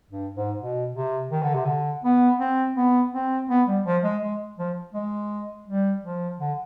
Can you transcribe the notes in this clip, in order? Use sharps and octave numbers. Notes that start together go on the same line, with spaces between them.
G2
G#2
B2
C3
D#3
D3
C3
D3
B3
C4
B3
C4
B3
G3
F3
G#3
G#3
F3
G#3
G3
F3
D3